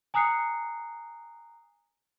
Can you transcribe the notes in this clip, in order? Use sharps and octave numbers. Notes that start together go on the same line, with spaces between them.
G#5 A#5 D#6 F#6 C7 C#7